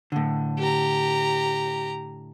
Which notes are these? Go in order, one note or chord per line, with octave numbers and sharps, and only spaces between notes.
A2 D3
G4 A#5